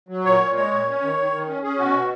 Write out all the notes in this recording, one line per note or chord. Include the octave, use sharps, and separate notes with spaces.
F#3
A#2 C#5
A#2
G#3 C#5
A#2
C#4
D#3
D#3
D#3
C#4
C#4 G#4
B2 F#4
B2